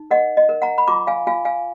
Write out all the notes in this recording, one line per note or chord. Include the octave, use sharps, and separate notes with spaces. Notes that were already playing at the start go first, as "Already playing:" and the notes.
Already playing: D#4
A#4 D#5 F#5
D#5
A#4
F#5 A#5
B5
F4 A#5 D6
F5 G#5
F4 F5 G#5
F5 G#5